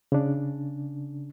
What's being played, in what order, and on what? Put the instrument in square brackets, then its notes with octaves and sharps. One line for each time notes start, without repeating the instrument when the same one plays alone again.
[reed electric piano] C#3 D4